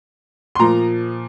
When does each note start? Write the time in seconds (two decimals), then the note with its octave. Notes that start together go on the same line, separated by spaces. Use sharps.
0.55 C6
0.59 A#2 F3 A#5